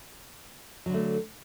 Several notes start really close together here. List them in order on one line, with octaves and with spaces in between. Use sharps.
F#3 D3 A3